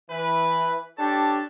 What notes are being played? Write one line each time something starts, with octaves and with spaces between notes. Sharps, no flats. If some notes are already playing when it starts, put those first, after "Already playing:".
E3 B4
D4 G4 A4 C#5 A5